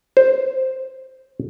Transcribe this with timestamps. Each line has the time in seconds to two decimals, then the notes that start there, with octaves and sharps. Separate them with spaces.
0.17 C5